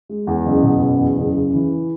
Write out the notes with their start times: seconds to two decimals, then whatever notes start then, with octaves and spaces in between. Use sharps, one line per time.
0.09 G#3
0.27 E2
0.46 F#1
0.63 B2
0.82 F#1
0.99 E2
1.17 F#1
1.35 C#3
1.54 E3